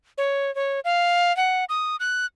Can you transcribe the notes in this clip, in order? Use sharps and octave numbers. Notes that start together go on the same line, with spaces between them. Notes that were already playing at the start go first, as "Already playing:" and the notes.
C#5
C#5
F5
F#5
D#6
F#6